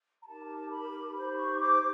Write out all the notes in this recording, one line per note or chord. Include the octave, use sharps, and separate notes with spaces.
A#5
D#4 G4 A#4 A5
B5
D#4 G4 C5 B5
C#6
D6